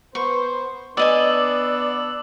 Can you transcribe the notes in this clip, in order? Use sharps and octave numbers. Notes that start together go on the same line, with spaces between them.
B3 B4 C5 C#6
B3 D4 D5 D#5 G#5 D6 E6 F#7